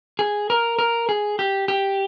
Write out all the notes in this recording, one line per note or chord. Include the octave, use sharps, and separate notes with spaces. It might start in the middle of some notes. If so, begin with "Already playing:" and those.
G#4
A#4
A#4
G#4
G4
G4